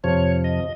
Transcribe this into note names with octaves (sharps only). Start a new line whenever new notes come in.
F2 C3 F3 C#5
D#5